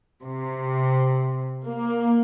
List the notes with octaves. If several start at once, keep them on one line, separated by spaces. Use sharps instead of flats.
C3
A#3